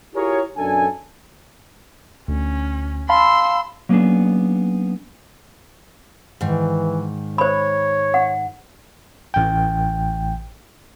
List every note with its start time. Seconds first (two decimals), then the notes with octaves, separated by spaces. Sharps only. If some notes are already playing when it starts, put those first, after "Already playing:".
0.15 E4 F4 G4 G#4 A#4 C#5
0.58 B1 F#2 D4 A4 G#5
2.28 D2 C#4
3.09 F5 A5 B5 C6 E6
3.89 F#3 A#3 B3 C#4 D4 G#4
6.41 G#2 D#3 E3
7.38 C5 C#5 B5
8.14 F#5
9.34 A1 G5